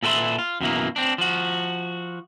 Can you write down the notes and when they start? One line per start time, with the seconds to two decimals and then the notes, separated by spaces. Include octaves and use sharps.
0.03 A#2 A4 B4 E5 C6
0.39 F4
0.61 F#2 B2 E3 A#3
0.96 C4 D4
1.18 F3 F#4